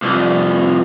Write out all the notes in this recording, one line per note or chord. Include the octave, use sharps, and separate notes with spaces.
C2 F2